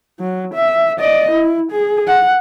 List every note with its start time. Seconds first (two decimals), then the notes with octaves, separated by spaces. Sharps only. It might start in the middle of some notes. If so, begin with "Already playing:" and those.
0.20 F#3
0.54 E5
1.00 D5 D#5
1.31 E4
1.72 G#4
2.07 F#5